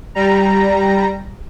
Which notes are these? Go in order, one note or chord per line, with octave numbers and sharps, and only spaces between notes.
G3 A#5